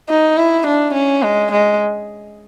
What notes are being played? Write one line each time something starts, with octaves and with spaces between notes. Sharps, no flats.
D#4
E4
D4
C#4
G#3
G#3